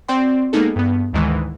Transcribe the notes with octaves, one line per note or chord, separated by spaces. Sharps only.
C4 F#4 D5 G5 C6
G#3 A#3 B3 D#4 G#4 A4
G2 B3
D2 G#2 D#3 E3 G#3